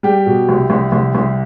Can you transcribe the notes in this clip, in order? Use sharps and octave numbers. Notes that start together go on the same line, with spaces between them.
G3 G4
B2
C2
C2
C2
C2